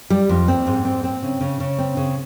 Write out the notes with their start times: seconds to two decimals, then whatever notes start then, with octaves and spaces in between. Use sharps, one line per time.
0.10 G3
0.29 F2
0.48 C4
0.67 G#2
0.85 C4
1.04 C4
1.22 C#3
1.41 C#3
1.60 C#3
1.78 C4
1.97 C#3